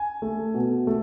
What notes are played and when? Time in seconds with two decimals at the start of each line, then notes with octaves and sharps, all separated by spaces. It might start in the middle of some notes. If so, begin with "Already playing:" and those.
Already playing: G#5
0.22 A3
0.54 B2
0.87 A3